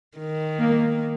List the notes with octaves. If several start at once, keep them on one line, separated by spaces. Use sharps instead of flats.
D#3
A#3